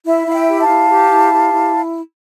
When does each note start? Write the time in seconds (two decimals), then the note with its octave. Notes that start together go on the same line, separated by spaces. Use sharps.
0.05 E4 E5
0.25 E4 F5
0.33 E5 G5
0.48 G4
0.61 F5 A5
0.68 E4
0.90 G4
1.11 E4
1.32 G4
1.53 E4